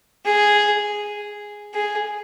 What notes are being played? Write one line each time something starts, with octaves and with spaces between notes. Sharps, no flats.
G#4
G#4